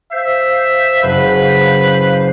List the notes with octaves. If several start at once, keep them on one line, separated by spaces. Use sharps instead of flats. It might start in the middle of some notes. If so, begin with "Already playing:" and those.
C5 E5 F5
F#1 B4